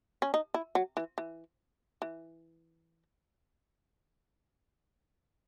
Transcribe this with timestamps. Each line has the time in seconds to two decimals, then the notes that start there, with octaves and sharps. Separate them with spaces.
0.22 C#4
0.34 D#4
0.54 E4
0.75 F#3
0.97 E3
1.18 E3
2.02 E3